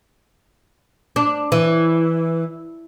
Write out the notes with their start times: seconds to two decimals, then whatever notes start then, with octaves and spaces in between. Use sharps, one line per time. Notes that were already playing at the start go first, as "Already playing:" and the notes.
1.16 D4
1.52 E3